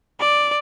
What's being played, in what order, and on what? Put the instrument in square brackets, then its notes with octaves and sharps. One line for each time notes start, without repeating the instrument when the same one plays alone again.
[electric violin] D5